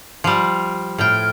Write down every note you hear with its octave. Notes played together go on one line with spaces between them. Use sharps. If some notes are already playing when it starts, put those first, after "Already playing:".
F3 G3
A2 G5 F6 G#6